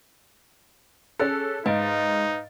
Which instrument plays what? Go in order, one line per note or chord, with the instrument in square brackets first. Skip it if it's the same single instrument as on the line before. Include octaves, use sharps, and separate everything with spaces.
[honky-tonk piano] C#4 A4 [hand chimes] G#4 F#6 A6
[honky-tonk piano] G#2 A6 D7 [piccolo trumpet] D#4 [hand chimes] B4 D#5 F5